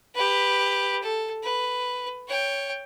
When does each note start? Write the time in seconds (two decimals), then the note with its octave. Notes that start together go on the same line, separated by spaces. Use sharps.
0.15 G4 B4
1.02 A4
1.43 B4
2.28 C#5 G5